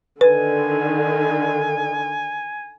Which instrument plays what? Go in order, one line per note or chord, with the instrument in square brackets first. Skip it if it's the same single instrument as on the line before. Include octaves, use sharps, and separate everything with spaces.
[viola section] D3 D#3 [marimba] B4 [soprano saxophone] G#5